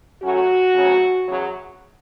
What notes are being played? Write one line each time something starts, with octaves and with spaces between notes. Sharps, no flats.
A2 F#3 A3 C#4 F#4
D2 C#3 F#3 A3 C#4
E2 C#3 F#3